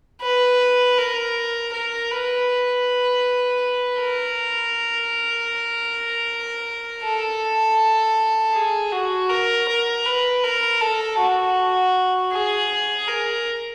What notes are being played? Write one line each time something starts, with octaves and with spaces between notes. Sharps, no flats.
B4
A#4
A#4
B4
A#4
A4
G#4
F#4
A#4
A#4
B4
A#4
A4
F#4
G#4
A#4